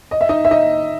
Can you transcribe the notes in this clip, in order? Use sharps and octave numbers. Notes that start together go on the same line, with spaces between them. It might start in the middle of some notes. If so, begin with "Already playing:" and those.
D#5
E5
D#4 D#5
E5
D#4 D#5